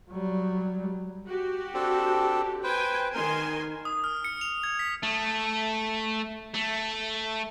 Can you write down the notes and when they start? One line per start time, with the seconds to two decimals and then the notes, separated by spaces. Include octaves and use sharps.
0.11 F#3 G3
1.26 F#4 G4
1.74 C4 D4 A4
2.64 B4 C5 G5 G#5
3.14 D#3 A#4 G#5 C6
3.85 D#6
4.04 F6
4.24 C#7
4.41 F7
4.64 G#6
4.79 B6
5.03 A3
6.55 A3